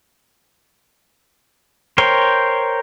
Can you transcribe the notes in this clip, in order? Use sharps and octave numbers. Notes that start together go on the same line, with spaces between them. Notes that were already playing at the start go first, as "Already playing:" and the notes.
A#4 C5 C#5 G5